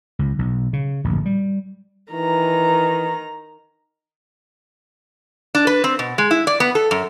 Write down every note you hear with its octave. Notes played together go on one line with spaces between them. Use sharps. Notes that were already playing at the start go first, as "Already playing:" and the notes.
C#2
B1
C#3
D1 A#1 F#2
G3
D#3 E3 A#5
D4
B4
C4
B2
G#3
E4
D5
B3
A4
F#2